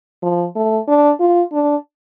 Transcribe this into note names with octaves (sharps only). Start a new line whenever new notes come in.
F3
A3
D4
F4
D4